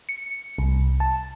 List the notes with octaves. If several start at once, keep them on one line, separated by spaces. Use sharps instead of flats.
C#7
C2
A5